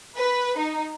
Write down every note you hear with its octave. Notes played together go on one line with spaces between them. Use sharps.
B4
D#4